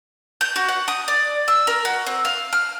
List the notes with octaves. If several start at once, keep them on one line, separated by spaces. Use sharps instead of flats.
G6
F#4
F#5
D#6
D5
E6
A#4
F#4
C4
F5
F6